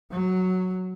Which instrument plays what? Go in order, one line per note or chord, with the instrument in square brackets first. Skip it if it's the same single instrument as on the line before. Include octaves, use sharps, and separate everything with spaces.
[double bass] F#3